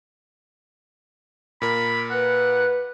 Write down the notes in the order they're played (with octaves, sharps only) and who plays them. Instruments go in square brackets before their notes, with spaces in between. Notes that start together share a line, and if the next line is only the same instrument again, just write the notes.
[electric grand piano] A#2 A#4 [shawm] B5
[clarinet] B4 [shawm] F#5